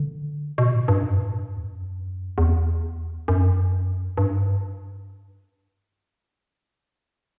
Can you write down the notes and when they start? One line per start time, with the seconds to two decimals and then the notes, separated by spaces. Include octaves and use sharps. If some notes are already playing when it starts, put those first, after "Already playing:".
Already playing: D3
0.58 B2
0.74 A2
0.88 G2
1.03 F#2
1.18 A2
1.33 G2
1.49 F#2
1.56 E2
1.64 F#2
2.38 E2
3.28 F#2
4.18 G2